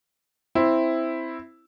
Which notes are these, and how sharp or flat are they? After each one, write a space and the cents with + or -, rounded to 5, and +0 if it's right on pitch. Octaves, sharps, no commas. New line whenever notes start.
C4 +0 E4 +0